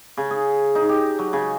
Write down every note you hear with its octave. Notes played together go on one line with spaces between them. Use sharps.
C#3
G#4
D#4
G4
F#3
C#3